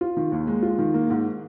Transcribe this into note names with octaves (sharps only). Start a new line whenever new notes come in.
F4
D#3
D#2
G#3
F4
D#3
A#3
G#2